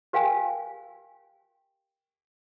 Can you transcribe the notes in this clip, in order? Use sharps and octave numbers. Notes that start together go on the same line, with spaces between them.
G4 A#4 F5 G5 G#5